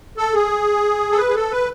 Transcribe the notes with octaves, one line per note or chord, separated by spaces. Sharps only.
A4
G#4
A4
B4
G#4
A4
B4